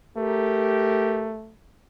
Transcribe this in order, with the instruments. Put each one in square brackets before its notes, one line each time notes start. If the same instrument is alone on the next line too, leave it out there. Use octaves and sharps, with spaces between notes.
[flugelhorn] A3 [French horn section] G4 A#4